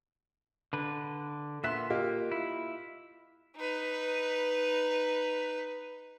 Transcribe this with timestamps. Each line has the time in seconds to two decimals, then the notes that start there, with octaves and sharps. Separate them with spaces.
0.73 D3 B4
1.64 A#2 B3 E5 C6 F#6
1.90 A#3 F4 G4 D#5
2.32 E4
3.56 D#4 B4